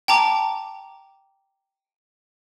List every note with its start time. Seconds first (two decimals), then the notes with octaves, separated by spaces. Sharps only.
0.08 G5 A5 A#5 D6